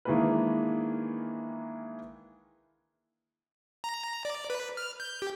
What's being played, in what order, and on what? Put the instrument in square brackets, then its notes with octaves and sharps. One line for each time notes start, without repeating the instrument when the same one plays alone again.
[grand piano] D#3 E3 G#3 A#3 D4 B4
[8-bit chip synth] A#5
D5
B4
F6
G6
G4